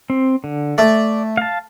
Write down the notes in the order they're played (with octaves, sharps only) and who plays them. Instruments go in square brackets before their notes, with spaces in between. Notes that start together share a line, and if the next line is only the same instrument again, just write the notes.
[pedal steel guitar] C4
D3
[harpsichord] A3 [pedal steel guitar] D5
[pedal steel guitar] F5 A5